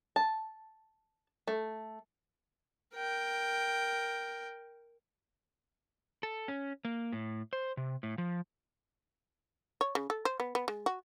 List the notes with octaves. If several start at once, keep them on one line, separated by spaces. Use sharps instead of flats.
A5
A3
A#4 G5
A4
C#4
A#3
A2
C5
C3
A2
F3
C#5
C#3
A4
C5
B3
B3
G#3
F#4